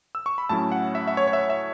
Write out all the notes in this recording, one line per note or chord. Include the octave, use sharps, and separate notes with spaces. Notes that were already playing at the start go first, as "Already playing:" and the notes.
E6
C#6
B5
A2 F#3 A3 C#4 E4 A5
F#5
E5
E5
C#5
C#5
E5
E5